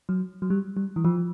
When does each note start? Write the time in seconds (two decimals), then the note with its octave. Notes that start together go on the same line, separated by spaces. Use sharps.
0.09 F#3
0.42 F#3
0.50 G3
0.77 G3
0.96 E3
1.05 F3